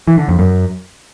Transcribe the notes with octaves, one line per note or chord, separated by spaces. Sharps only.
E3
D3
F2
F#2